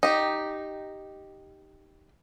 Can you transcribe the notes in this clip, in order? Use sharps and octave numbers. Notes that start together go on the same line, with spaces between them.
D#4 G4